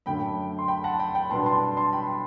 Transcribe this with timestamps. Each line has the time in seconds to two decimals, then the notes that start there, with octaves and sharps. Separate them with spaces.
0.06 F#2 D3 A3 G5 B5
0.58 C6
0.68 G5 B5
0.84 F#5 A5
0.99 G5 B5
1.15 G5 B5
1.30 B2 G3 B3 D4 A5 C6
1.46 A5 C6
1.77 A5 C6
1.93 G5 B5